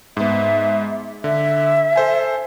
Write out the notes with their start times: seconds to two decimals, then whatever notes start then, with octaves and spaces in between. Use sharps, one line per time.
0.17 G#2 B3 E5
1.24 D3 E5
1.96 A4 C5 G#5